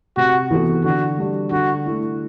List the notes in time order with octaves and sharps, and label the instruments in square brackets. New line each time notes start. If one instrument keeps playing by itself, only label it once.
[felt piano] C3 [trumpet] F#4
[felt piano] E3 B3 F#4 A4
[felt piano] D3 [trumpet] F#4
[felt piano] G3 D4
[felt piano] D3 [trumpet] F#4
[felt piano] A3 E4